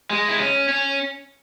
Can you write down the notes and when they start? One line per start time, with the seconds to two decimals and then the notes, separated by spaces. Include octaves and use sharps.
0.10 G#3
0.29 E4
0.39 C#4
0.69 C#4